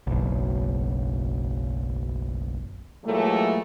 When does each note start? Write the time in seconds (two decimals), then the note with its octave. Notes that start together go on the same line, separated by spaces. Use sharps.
0.07 F#1 B1
3.05 A#2 E3 F#3 G#3 A3